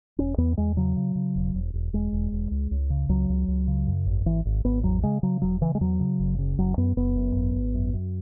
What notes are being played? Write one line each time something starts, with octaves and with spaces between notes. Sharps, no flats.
E1 C#4
E2 B3
E2 G#3
C#3 F#3
C#3
C#3
E1
E1
E1
E1 G#3
E1
E1
C#2
C#2
C#3
C#2 F#3
C#2
C#2
C#3
F#2
G#1
G#1 E3
G#1
G#1 B3
E2 F#3
C#3 G#3
C#3 F#3
E1 F#3
C#3 E3
G#3
E2 F#3
C#3
F#1
C#3
F#1 F#3
F#2 B3
F#1 B3
F#2
G#1
G#1
F#2
F#2